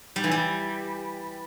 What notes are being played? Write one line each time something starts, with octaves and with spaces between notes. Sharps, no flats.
G3
E3
G3